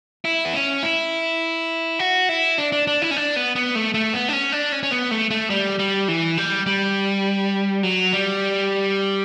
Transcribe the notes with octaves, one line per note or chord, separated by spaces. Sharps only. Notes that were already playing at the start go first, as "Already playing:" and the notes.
E4
B3
C#4
E4
F#4
E4
D4
D4
D4
E4
C#4
D4
B3
B3
A3
A3
B3
D4
C#4
D4
C#4
C#4
B3
A3
A3
G3
G3
E3
G3
G3
F#3
G3